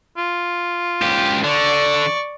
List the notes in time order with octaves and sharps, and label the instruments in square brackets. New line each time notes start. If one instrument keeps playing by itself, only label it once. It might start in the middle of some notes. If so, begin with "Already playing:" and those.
[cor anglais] F4
[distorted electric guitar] C#2 G4
[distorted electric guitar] D3 [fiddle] D5 C#6